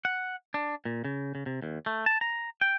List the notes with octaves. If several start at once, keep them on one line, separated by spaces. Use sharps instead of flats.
F#5
D4
A#2
C#3
C#3
C3
D#2
A3
A5
A#5
G5